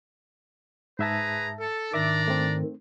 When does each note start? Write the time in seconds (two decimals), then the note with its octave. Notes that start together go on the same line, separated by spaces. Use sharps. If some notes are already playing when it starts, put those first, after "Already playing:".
0.99 G#2 G#4 B4 E5 A5 A#5
1.58 A4
1.93 G#2 D#3 D4 D5 E5 A#5 D6
2.28 A3 C4